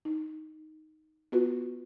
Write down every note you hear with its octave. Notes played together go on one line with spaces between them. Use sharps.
D#4
B3 F4 F#4 B4